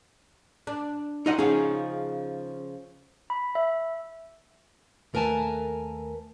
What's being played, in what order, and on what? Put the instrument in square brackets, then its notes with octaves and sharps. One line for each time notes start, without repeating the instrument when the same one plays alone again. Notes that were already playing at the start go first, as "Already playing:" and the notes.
[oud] D4
[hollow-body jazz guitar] D#4 D#5 F#5
[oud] C#3 F3 [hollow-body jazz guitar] C#4 D#4 G#4
[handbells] B5
E5
[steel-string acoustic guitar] D#2 A3 A#4 B4 G#5 A5